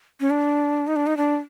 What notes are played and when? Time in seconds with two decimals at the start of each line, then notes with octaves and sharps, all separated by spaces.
0.20 C#4
0.30 D4
0.87 D#4
0.96 D4
1.07 D#4
1.17 D4